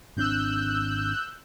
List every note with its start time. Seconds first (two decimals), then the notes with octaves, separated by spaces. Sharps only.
0.17 G#1 C4 D4 E6 F#6 G6